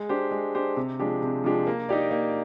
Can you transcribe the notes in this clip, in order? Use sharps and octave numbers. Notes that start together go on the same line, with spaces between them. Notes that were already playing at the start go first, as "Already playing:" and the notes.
Already playing: G#3
D4 G4 C5
G#3
D4 G4 C5
C3
F3 G#3 D4 G4
C3
F3 G#3 D4 G4
A#3
D#4 G4 D5
A#3